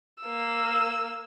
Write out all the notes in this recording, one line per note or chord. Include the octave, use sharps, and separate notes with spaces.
A#3 E6